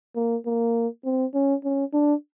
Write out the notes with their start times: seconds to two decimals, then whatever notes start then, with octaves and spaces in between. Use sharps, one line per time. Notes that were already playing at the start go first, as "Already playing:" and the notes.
0.16 A#3
0.46 A#3
1.05 C4
1.34 C#4
1.64 C#4
1.94 D4